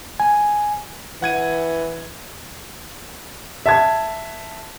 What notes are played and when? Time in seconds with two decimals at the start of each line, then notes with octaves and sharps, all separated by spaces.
0.20 G#5
1.22 E3 F#5 G#6 D#7
3.66 E5 A5 G#6